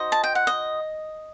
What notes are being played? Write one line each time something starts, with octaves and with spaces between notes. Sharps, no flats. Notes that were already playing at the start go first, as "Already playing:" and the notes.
Already playing: D#4 F#4 C5 D#5
A5
G5
F#5
D#5